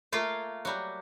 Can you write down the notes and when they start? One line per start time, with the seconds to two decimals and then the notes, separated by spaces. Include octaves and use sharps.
0.12 A3 A#3 F4 F5
0.65 F#3 G3